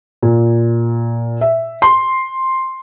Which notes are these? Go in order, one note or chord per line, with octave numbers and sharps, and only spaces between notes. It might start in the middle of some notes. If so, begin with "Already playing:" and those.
A#2
E5
C6